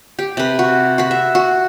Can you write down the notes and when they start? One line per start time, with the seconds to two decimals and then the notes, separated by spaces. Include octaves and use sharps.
0.19 G4
0.37 C3 B4
0.59 F#4
0.98 F#4 B5
1.11 E5
1.35 F#4